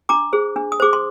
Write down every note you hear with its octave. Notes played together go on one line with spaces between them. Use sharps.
D4 A#5 D6
G#4 C5
D4
D#6
G#4 C5 D6
C6